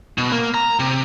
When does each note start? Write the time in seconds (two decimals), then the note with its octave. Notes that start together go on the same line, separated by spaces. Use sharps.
0.18 B2
0.32 A#3
0.54 A#5
0.79 C3